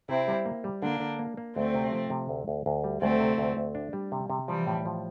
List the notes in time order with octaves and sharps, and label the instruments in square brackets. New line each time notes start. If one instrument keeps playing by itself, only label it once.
[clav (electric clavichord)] C3 [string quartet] C4 E4
[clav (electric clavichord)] G3
A#3
G3
[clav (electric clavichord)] D3 [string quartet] A#3 D4
[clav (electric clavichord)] D3
A#3
A#3
[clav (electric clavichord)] D2 [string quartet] A3 C4
[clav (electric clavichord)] C3
F3
C3
D2
D2
D2
G3
[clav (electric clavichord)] D2 [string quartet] A3 C4
[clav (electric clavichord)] C3
D2
D2
D4
G3
C3
C3
[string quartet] E3 G3 [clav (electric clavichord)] F3
[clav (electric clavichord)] A2
F3